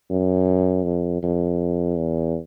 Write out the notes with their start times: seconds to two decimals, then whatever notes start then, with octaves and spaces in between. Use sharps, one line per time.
0.10 F#2
0.84 F2
1.23 F2
1.98 E2